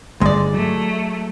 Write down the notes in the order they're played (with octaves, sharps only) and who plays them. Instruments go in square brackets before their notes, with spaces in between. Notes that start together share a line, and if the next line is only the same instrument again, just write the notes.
[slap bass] G1 [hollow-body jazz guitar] G#3 D5
[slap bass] F#3 [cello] A3